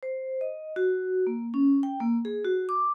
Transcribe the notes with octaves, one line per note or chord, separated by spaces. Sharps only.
C5
D#5
F#4
A#3
C#4
G5
A#3
G#4
F#4
D6